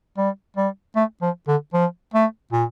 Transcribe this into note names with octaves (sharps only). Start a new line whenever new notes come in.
G3
G3
A3
F3
D3
F3
A3
A#2